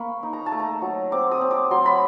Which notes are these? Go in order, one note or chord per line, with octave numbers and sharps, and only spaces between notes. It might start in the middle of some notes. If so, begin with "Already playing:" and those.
Already playing: A#3 B5 C#6
D#4
A#5
A5
A3
A#5
F#3
C4 D6
D#6
C4
D6
F#3 C6
B5